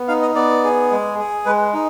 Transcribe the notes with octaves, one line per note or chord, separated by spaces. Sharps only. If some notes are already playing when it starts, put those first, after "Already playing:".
Already playing: B3
D#4 F5
D#5
B3 D5
G#4
G#3
G#4
G#3 B4
D#4